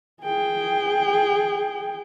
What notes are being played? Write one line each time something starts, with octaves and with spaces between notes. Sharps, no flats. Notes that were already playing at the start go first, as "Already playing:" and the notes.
G#4 G5